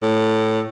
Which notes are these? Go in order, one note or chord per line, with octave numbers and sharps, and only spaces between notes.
A2